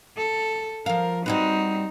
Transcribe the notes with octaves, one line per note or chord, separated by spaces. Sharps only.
A4
F3 A#4 F5
G3 C4 D#4 F#4 B4